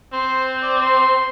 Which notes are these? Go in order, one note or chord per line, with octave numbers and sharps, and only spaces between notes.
C4 C5
D5
C6